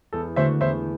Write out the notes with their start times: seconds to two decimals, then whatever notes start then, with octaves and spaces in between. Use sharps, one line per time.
0.13 E2 A4
0.36 D3 A3 D4 F#4 C5 E5
0.61 E2 C5 E5